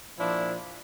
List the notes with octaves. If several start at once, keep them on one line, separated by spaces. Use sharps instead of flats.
A#2 F3 D4 E4